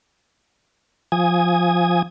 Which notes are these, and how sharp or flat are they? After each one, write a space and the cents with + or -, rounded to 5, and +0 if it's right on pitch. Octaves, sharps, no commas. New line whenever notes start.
F3 +5 G#5 -5 D#6 +0